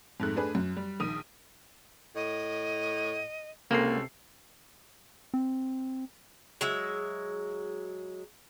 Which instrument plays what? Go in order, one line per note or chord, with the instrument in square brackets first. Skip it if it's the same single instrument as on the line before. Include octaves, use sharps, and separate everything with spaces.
[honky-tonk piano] F2 G#2 A3 F#6
A3 D4 G#4 B4
F#2
G3
A#1 D#3 D#6 D#7
[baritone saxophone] A2 [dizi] D#5
[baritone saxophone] C#2 [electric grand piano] C3 A4 C7 [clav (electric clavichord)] A#3
[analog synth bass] C4
[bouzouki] F#3 G#3 E5